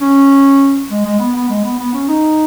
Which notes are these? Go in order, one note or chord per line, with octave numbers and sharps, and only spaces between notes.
C#4
G#3
G#3
B3
B3
G#3
B3
B3
C#4
D#4